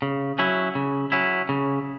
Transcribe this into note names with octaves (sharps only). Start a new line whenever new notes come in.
C#3
F#3 C#4 E4
C#3
F#3 C#4 E4
C#3